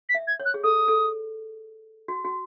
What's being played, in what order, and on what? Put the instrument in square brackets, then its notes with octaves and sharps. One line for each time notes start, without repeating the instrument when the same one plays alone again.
[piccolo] B6
[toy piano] E5
[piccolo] G#6
[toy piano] C#5
[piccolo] F#6
[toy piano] G#4
[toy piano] A4 [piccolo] D#6
[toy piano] A4
F#4
F#4